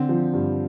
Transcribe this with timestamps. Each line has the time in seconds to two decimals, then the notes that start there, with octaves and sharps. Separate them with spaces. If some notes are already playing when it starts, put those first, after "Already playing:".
Already playing: D3 C4
0.09 F3
0.33 G2